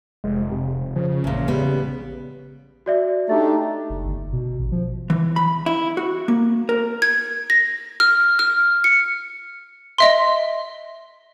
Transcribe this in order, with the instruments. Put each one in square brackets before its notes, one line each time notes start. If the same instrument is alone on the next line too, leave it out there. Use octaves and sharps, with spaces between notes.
[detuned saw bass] F1 [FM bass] G#3
[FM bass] C3
[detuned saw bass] C#3 [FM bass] F3
[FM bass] A1 [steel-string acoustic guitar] E2 A#2
[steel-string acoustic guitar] G3 B3
[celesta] F#4 D5 E5
[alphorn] A3 [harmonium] D4 D#4 G4 [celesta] A4 A6
[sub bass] F#1
G1
B2
A1
F3
[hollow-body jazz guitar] E3
B5
E4
F#4
A#3
A#4
[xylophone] G#6
A#6
F6
F6
C#7
D#5 E5 C6